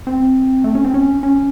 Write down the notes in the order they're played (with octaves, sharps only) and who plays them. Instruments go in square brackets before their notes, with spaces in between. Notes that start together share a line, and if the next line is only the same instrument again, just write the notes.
[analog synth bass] C4
A3
C#4
C4
C#4
C#4